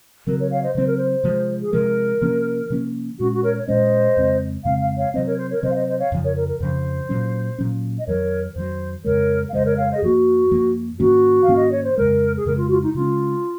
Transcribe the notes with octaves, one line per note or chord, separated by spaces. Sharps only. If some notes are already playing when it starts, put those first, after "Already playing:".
C#3 F#3 C4 A#4
A#4 C#5
C#5 F5
C5 D#5
C#3 F#3 C4 C5
A#4
C5
C3 F3 G#3
G#4
C3 F3 G#3 A#4
C3 F3 A#3 C#4
C3 F3 A#3 C#4
A#2 G#3 C#4 F#4
F#4
A#4 C#5
C#5
A#2 G#3 C#4 C5 D#5
F2 C#3 G#3 C4
F2 C#3 G#3 C4 F5
F5
C#5 F5
C3 F#3 C4 C5 D#5
A#4 C#5
C5
A#4 C#5
C3 F#3 C4 C5 D#5
F5
C5 D#5
C5 D#5
C#5 F5
F2 C#3 F3
A#4 C#5
A#4
A#4
F2 C#3 F3 C5
A#2 F#3 C#4
A#2 F#3 C#4
D#5
F2 D#3 F#3 A#4 C#5
F2 D#3 F#3 C5
F2 C#3 G#3 A#4 C#5
F5
F2 C#3 G#3 C5 D#5
A#4 C#5
C#5 F5
C5 D#5
G#4
F#2 F3 A#3 F#4
F#2 F3 A#3
G#2 D#3 A#3 C#4 F#4
F5
G#2 D#3 A#3 C#4
D#5
C#5
C5
F2 C#3 G#3 A#4
G#4
F2 C#3 G#3 A#4
F4
F#4
F4
D#4
C#3 G#3 C#4 F4